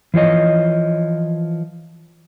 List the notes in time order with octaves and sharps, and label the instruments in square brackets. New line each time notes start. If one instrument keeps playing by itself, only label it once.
[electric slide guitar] E3 F3 C#5 D#5